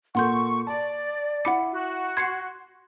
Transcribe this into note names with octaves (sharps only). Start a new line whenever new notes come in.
A#2 A#3 A4 F#5 C6 C#6 G6
D5 A5
E4 F#5 B5 D6 C#7
F#4
C6 G#6 C7 C#7